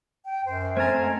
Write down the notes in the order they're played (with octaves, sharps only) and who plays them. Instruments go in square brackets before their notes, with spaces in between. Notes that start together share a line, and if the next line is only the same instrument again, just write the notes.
[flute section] G5
[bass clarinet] F#2 [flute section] C5
[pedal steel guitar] A3 C4 A#5 [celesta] C5 A6 [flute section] G#5 F6 G#6
[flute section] D#5 F#5